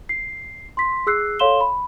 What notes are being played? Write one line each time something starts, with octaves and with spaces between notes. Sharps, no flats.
C7
C6 B6
G#4 E6 F#6 C7
A4 C#5 F5 C6 E7 G7
B5